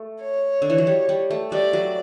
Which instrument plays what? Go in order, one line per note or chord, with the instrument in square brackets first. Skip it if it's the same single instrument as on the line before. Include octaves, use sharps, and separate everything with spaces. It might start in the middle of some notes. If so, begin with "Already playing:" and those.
Already playing: [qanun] A3
[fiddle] C#5
[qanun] D3
E3
F#3
G3
G3
A3
[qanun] G3 [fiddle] D5
[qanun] F#3